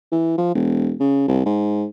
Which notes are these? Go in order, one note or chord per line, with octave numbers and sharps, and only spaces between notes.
E3
F3
E1
C#3
C2
G#2